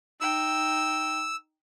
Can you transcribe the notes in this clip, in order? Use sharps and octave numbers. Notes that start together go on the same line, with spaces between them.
D#4 G5 E6